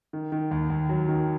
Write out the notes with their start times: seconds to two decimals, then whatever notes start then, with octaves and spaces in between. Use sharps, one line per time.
0.13 D#3
0.32 D#3
0.51 D#2
0.70 D#2
0.89 F#3
1.09 D#3